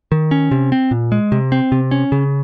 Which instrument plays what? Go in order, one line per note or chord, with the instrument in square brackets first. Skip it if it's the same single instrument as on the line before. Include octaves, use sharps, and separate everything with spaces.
[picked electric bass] D#3
C#4
C3
C4
A#2
G#3
C3
C4
C3
C#4
C#3